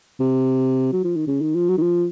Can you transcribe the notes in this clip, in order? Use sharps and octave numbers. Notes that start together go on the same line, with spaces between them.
C3
F#3
F3
D#3
C#3
D#3
F3
F#3
D#3
F3